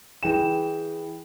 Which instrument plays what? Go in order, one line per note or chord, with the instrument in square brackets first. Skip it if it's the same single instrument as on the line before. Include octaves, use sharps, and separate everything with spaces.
[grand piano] E3 G#4 G5 E7